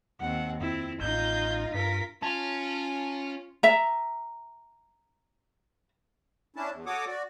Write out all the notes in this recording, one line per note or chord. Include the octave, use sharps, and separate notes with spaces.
D#2 C4 F#5
F2 C4 E4
A1 D#4 F4 G6
G2 F4 A#4 B6
C#4 F4 A5
E5 A#5
C#4 D4 E4 A5
E2
F#4 A4 C#5 F#5 D6 D#6
F#4 D5